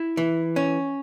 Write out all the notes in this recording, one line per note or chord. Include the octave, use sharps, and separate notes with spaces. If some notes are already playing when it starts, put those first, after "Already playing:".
Already playing: E4
E3
C#4